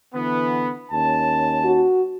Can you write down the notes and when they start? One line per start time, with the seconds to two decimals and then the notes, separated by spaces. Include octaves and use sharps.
0.15 D3 E3 B3
0.92 D#2 C#4 A5
1.64 F#4